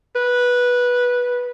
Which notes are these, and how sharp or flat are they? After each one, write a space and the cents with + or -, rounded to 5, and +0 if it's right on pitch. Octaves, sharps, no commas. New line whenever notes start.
B4 -10